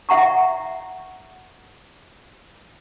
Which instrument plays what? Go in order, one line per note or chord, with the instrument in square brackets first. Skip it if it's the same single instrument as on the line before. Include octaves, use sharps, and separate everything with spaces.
[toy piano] E5 F#5 A#5 C#6